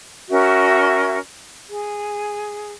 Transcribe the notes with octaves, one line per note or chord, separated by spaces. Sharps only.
C#4 F#4 A#4 E5
G#4